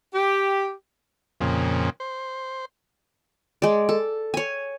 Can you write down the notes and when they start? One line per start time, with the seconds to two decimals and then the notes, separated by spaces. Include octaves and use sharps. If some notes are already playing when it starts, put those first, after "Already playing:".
0.13 G4
1.41 F2 A#2 C#3
2.00 C5
3.62 G#3 D5
3.89 A4
4.34 C#5 G#5